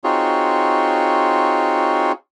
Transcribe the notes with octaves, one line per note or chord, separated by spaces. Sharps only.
C4 D#4 F4 F#4 G#4 C#5